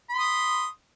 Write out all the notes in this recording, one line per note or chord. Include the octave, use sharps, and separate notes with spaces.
B5 C6 D#6